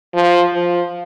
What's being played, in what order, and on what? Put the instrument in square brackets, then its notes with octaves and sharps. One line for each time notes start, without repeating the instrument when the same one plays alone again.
[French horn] F3
F3